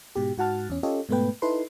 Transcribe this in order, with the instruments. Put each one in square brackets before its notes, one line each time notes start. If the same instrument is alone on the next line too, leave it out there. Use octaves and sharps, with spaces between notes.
[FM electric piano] G#2 B2 G4
G#2 F#4 F#5 A5 F6 A6
E2 C#4
C#4 F4 G4 A4 C#5 D#5
G#2 B2 A3 B3 B4 G5
D#4 E4 A4 B4 C6